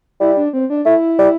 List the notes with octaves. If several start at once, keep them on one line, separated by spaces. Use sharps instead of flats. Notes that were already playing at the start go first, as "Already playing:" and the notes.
G3 E4
D4
C4
D4
A3 E4
G3